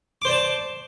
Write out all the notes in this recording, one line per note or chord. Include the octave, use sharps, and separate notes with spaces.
C5 D5 A5 D6